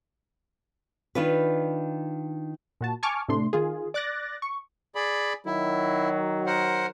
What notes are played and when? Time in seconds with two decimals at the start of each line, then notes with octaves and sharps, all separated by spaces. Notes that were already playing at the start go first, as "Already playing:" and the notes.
1.15 D#3 D4 F4 B4
2.81 A#2 F#4 A5
3.03 G#5 A5 C#6 D6 F6
3.28 A2 C3 A3 D4 C6
3.53 D#3 F4 G#4
3.94 D5 D6 F#6 A6 A#6
4.42 C#6
4.95 G#4 D5 B5
5.46 D#3 F#3 E4
6.46 A#4 C5 F#5